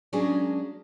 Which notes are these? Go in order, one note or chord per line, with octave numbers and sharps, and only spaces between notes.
F#3 G#3 A#3 C#4 D4 G#4